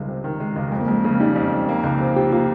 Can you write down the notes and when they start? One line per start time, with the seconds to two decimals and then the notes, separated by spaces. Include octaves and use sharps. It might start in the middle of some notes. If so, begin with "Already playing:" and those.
Already playing: G#1 C#2 G3 G#3
0.08 C3
0.24 D#3
0.40 G#3
0.56 C#2
0.72 F2 G#3
0.81 A#3
0.88 F2 G#3
1.00 A#3
1.04 C#3 G#3
1.20 G3 D#4
1.36 F2
1.53 F2
1.69 A#3
1.84 C#2
2.00 C3
2.16 F3 G4
2.32 A#3 F4